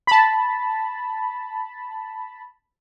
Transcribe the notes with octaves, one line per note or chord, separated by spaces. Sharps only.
A5 B5